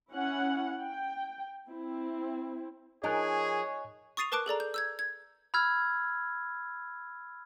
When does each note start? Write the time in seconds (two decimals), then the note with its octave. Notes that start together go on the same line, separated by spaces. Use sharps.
0.12 C#4 E4 F#5
0.82 G5
1.70 C4 E4
3.04 F3 D#4 G#4 A#4 C#5 D#5 G#5 F#6
4.17 C#6 D#6 A6 C7 D#7 F7
4.32 A#4 B4 A5 D6 F#6 D7
4.46 G#4 A4 D5 A#5
4.60 G6
4.74 E6 G6 G#6
4.99 G#6
5.54 B5 E6 F6 G#6